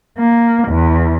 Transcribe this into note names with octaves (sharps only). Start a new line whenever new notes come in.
A#3
E2